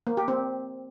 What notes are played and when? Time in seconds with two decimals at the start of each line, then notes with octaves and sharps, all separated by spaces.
0.07 A#3
0.17 G4
0.28 C4